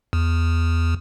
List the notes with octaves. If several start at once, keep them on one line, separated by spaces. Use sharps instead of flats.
E2